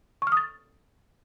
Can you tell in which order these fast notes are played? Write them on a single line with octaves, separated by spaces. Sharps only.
C#6 F6 D#6 A6